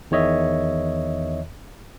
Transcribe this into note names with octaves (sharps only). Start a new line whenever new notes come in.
E2 D#3 C#5 D#5 E5